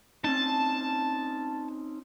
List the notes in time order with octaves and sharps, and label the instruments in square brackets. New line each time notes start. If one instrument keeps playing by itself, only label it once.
[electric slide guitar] C4 C#4 D#4 [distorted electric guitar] A5